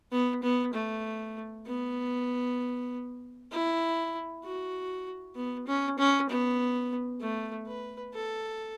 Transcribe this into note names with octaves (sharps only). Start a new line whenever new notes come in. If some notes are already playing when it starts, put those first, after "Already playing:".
B3
B3
A3
B3
E4
F#4
B3
C#4
C#4
B3
A3
B4
A4